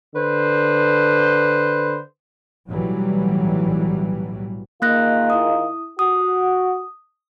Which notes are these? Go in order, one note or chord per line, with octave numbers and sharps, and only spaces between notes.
D3 B4 C5
B1 A2 E3 F#3 G3
D#3 G#3 A#3 F4 F#6 A#6
E4 D#6
F#4 D#6